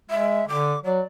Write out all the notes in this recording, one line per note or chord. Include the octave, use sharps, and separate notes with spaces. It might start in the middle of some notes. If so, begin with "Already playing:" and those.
G#3 E5
D3 D6
F#3 D5